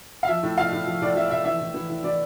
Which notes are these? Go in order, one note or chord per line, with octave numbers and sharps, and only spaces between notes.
F5
F3 E5
A2
F3 F5
A2
F3
A2 D5
F3 E5
A2 E5
E3 E5
A2
E3
A2
E3 D5